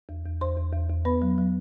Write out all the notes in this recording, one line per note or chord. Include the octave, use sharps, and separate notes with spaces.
E2
E2
E2 C5 C6
E2
E2
E2
B3 B4 B5
F#3
F#3